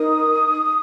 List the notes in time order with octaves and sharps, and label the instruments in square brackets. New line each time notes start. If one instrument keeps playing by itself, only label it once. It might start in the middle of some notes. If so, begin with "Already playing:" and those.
Already playing: [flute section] D#4 A#4 D#6